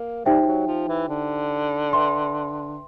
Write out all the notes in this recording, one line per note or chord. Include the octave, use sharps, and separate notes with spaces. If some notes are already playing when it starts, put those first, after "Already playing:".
Already playing: A#3
G3 D#4 G4 C5 E5 G5
F3
F#3
F3
E3
D3
B4 E5 G5 C6